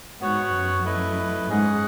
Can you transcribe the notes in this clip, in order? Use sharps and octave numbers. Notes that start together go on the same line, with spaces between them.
G#2 B3 F#4 C#5 F#5
F#2
A3 E4 B4 D#5
G#2 C#4 G#4 D#5 F#5